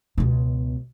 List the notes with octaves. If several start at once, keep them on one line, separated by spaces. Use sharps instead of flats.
C#2 B2